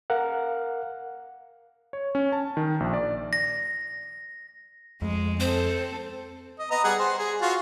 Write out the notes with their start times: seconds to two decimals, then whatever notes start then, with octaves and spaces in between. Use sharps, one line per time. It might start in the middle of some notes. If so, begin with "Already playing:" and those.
0.10 A#4 F5 F#5
1.93 C#5
2.15 C#4
2.32 A5
2.57 D#3
2.80 A#1
2.93 D5
3.33 A#6
5.02 F2 G#3
5.40 C4 A4 C5
6.59 D#5
6.71 B3 D#5 A#5
6.84 G3 G#4 F#5
6.99 C5
7.18 G#4
7.41 F4 F#4